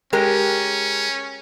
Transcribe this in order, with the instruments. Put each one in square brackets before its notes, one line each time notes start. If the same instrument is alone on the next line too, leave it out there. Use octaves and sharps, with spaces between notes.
[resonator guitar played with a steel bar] G#3 G4 A#4 [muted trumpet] C#4